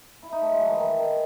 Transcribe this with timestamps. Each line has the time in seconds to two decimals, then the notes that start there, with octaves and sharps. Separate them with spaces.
0.23 E4
0.32 D#4
0.42 A3
0.52 G#3
0.61 F#3
0.70 E3
0.79 D#3
0.99 D#3